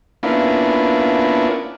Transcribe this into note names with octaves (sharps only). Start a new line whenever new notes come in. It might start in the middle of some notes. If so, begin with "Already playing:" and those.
A#3 B3 C#4 D4 E4 F4